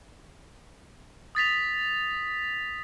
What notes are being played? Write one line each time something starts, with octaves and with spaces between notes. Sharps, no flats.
D#6 A6 B6 F7